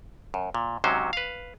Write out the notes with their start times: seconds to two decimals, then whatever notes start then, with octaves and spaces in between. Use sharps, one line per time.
0.34 F#2
0.54 A#2
0.84 G#2 C3 F#3 C#4 C5
1.13 B4 F5